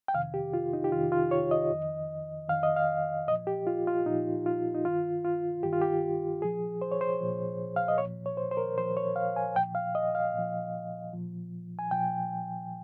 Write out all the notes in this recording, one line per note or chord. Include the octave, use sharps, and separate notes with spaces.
G5
F2 C3 D#3 F5
G4
F4
D#4
G4
F2 C3 D#3 F4
F4
C#5
D#5
F2 D#3
F2 D#3 F5
D#5
F5
A#2 F3 D#5
G4
F4
F4
A#2 F3 D#4
F4
D#4
G2 D#3 F4
F4
G2 D#3 G4
F4
G4
A#2 F3 G#4
C5
C#5
C5
A#2 F3
F5
D#5
A#2 F3 C#5
C#5
C5
C5
A#4
A#2 F3 C5
C#5
F5
G#5
A#2 F3 G5
F5
D#5
F5
A#2 F3
A#2 F3
G#5
A#2 F3 G5